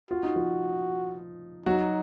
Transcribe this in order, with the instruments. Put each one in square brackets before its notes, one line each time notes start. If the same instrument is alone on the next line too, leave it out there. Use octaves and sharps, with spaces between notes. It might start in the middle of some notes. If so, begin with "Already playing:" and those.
[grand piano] F4 [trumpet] F#4
[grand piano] D#4
F3 F4
[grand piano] F#3 F#4 [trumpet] D#4